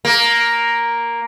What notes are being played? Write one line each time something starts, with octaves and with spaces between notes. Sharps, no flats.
A#3